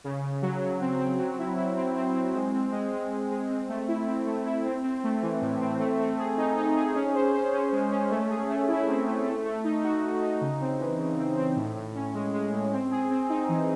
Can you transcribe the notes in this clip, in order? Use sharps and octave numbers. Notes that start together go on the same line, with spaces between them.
C#3
C#3
F#3
F#3
C4
C4
F#3
E4
E4
C4
C4
C4
G#3
C4
G#3
G#3
G#3
G#3
C4
A3
E4
C4
A3
E4
C4
C4
A3
E3
A2
C4
A3
A3
G#4
D#4
D#4
G#4
C#4
C5
C5
C#4
G#3
C#4
A3
G#4
A3
E4
C4
A3
A3
A3
D#4
F#4
D#4
D#4
C#3
C4
E3
C#3
C4
C4
A2
A2
C#4
G#3
G#3
A2
C4
G#4
C4
D#4
E3